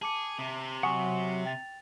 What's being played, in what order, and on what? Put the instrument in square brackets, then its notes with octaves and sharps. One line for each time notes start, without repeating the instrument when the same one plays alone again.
[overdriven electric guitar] G#4 [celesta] A5 D6 C#7
[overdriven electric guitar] C3
[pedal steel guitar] F#3 F#5 [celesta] G#5 C#6 D#6
[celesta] G5 A6 F7